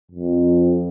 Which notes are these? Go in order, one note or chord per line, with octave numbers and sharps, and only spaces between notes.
F2